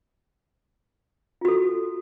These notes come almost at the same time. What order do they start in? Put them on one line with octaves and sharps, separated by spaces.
F4 F#4 A4